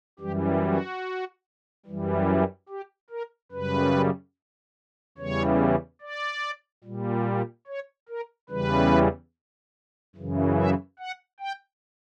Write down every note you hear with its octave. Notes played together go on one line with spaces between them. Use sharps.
F#2 E3 G3 G4
F#4
F#2 E3 G3
G4
A#4
F#2 C#3 G3 B4
E2 C#3 E3 G3 C#5
D5
A#2 G3
C#5
A#4
E2 C#3 E3 G3 B4
F#2 C#3 E3
E5
F#5
G5